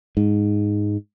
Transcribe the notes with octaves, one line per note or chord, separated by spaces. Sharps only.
G#2